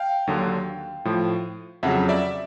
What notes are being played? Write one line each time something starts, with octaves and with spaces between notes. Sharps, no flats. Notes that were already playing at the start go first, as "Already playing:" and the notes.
Already playing: F5 G5
D#2 D3 F#3
A2 F3
F2 C#3 F#3 E5 F#5
D5 E5